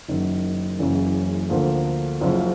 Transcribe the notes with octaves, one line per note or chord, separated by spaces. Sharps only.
F#1 F#2 D#3
F#1 F#2 C#3 E3
D2 D3 F3 A#3
F#1 F#2 C#3 F3